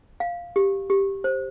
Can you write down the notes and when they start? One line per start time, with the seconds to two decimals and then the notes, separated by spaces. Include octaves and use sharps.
0.20 F5
0.56 G4
0.90 G4
1.24 C5